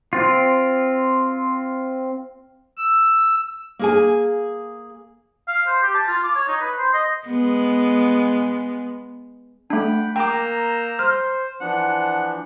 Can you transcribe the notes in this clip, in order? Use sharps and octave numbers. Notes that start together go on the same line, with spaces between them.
C4 F4
E6
A#3 G#4 G#5
F5
C5
G4
A5
F4
D6
C#5
D#4
B4
C5
D#5
G#3 B3
A3 D4 F#5 G5 B5
A#3 G5 A#5 D6 E6 G6
C5 F6
E3 F3 D4 F#5